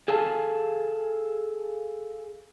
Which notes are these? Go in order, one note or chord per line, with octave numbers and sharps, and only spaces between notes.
G#4 A4 F5 G#5 A5